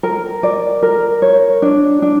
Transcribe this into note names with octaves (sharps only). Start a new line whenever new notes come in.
A#4
D5
A#4
C#5
D4
D4